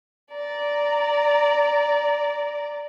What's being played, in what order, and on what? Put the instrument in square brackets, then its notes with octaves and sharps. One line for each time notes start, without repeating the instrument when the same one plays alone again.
[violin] D5 A#5